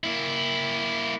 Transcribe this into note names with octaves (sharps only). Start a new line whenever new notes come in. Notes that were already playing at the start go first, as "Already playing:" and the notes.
A#3 E4